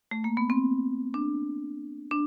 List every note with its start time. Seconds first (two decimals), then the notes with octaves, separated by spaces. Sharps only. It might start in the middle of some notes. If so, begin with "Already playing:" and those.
0.11 A3
0.24 A#3
0.37 B3
0.50 C4
1.14 D4
2.11 D4